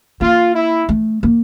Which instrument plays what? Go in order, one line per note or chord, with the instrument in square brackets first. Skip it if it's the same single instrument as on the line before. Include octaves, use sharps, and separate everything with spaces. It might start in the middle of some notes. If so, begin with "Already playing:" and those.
[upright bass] A#3 [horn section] F4
[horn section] E4
[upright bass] A3
A#3